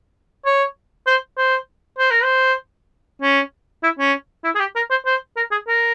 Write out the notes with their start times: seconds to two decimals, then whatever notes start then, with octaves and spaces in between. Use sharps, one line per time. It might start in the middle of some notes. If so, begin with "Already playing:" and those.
0.45 C#5
1.07 C5
1.37 C5
1.99 C5
2.11 A#4
2.24 C5
3.22 C#4
3.83 E4
3.99 C#4
4.44 E4
4.55 G#4
4.59 G4
4.76 A#4
4.91 C5
5.06 C5
5.37 A#4
5.51 G#4
5.68 A#4